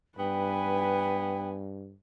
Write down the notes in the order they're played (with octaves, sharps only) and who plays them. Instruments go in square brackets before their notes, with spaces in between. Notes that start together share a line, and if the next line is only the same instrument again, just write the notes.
[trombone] G2 [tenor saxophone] B3 [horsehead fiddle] B4 G#5 [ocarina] G5